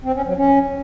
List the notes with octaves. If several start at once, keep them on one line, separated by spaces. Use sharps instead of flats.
C4
C#4
F#3
C#4